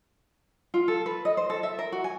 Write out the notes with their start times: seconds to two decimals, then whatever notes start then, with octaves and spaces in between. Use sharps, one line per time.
0.74 F4
0.88 A4
1.06 B4
1.25 D#5
1.37 C5
1.50 A4
1.63 E5
1.79 A#4
1.92 F#4
2.04 G#5